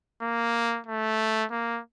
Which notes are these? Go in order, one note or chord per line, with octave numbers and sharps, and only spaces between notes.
A#3
A3
A#3